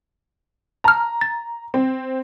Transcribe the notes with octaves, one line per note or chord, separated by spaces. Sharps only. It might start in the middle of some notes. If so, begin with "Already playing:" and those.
A5 A#5 F6
A6
C4